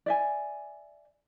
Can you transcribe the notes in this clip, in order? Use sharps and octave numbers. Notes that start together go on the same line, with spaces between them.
D5 E5 G#5